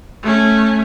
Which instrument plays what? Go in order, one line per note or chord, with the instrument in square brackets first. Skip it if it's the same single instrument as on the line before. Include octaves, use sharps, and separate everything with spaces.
[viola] A3 C#4